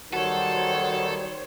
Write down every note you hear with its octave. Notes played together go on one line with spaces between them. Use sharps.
D#3 F#3 G3 F#4 A4 C5 C#5